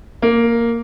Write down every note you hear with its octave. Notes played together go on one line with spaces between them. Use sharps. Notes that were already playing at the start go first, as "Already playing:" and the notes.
A#3